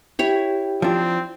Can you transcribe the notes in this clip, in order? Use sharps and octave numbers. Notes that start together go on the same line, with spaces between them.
E4 G4 C#5 G5
F3 C4 D4